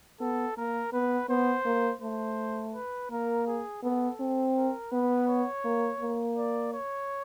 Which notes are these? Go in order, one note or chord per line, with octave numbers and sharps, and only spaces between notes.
B3 A4
A#3 A#4
B3 B4
B3 C5
A#3
A3 C5
B4
A#3 A#4
G#4
B3 A4
C4
A#4
B3 B4
C#5
A#3
A#3
D5
C#5